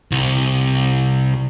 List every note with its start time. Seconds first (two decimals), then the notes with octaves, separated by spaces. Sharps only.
0.12 C2